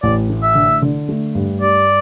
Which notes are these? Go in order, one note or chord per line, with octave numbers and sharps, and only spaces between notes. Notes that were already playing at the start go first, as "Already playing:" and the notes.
A1 D5
A3
E5
D3
D3
A3
G2
G3 D5